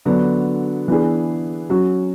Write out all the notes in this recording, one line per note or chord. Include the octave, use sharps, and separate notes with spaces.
D3 F#3 B3 D4
E3 B3 D4 G#4
F#3 C#4 F#4